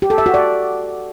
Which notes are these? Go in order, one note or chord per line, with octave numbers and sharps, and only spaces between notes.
G4
A4
E5
F#4
D5